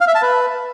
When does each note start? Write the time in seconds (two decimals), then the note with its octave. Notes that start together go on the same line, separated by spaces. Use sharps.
0.01 F5
0.08 E5
0.15 A5
0.22 B4